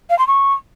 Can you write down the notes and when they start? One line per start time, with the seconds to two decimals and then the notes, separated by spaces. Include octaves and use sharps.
0.10 F5
0.19 C6
0.28 C#6